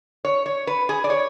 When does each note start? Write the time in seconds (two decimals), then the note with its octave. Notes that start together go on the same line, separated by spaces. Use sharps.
0.25 C#5
0.46 C#5
0.67 B4
0.89 G#4
1.04 D5
1.10 C#5